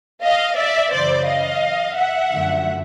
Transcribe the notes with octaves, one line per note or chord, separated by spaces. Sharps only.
D#5 F5
D5 E5
F#2 C#3 E3 C5 D5
D#5 F5
E5 F#5
F#2 D3 F3 A3